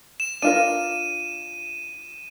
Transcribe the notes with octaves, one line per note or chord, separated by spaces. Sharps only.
E7
D4 F4 A#4 D#7